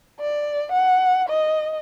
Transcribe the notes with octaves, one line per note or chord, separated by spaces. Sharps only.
D5
F#5
D#5